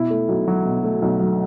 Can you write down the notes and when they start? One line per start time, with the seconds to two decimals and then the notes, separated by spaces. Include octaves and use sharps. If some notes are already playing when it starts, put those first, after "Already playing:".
Already playing: B2 E4
0.10 A3
0.29 B1
0.48 F#3
0.65 B2
0.84 A3
1.02 B1
1.20 F#3